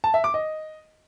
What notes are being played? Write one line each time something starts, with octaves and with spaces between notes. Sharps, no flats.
A5
E5
D6
D#5